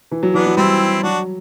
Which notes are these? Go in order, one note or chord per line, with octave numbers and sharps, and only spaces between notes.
E3
F#3
E3 B3 D4
F#3
G3 C4 E4
F#3 D4 F#4